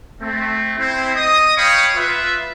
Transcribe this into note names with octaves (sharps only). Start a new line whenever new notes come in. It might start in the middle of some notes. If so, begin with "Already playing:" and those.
A3 C4
C4 E4 C5
D#5 D#6
C#5 F5 G5 B5 C#6 D#6
F4 B4 E5